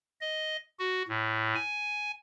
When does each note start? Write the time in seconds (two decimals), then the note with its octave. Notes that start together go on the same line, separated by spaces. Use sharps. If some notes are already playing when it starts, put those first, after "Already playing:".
0.21 D#5
0.79 F#4
1.08 A2
1.55 G#5